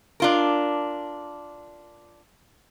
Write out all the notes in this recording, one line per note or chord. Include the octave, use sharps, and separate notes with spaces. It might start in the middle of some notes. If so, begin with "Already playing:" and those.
D4 F4 A#4